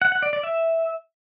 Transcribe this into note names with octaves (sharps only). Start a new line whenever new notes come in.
F#5
F#5
D5
D5
E5